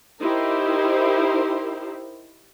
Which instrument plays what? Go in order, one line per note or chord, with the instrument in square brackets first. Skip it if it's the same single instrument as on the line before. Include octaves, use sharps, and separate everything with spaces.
[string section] D#4 E4 G4 A#4 C5